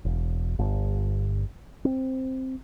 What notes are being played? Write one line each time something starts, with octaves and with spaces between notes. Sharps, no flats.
E1
G1
C4